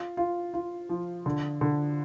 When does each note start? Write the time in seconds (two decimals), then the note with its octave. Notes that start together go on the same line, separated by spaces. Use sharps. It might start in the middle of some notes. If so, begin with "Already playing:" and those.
Already playing: F4
0.17 F4
0.54 F4
0.89 F3
1.26 D3
1.61 D3